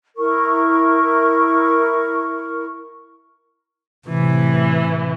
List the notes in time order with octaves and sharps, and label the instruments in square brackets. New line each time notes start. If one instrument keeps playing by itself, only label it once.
[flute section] E4 A#4 C#6
[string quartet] A2 E3 [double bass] C3